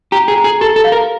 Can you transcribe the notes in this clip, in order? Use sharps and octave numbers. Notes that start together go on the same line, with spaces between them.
G4 A#5
G#4
A#5
G#4
G4 A4
A4
F5
A#4